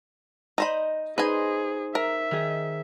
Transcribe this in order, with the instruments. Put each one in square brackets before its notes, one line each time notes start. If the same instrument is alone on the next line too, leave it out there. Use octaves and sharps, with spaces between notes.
[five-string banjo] D#4 C5 B5 [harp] D#5
[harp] D#4 C5 [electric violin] G#4 [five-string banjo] B4 G#5
[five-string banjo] A#4 [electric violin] E5
[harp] D#3 G#4